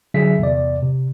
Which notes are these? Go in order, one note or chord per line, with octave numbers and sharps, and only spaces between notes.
D3 F#3 G#4 E5 B6
E2 C3 D5
C3